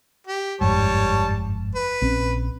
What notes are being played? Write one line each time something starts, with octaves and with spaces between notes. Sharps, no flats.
G4
G1 F2 G#2 G3 C#5 A5
B4
A#1 C4 C#4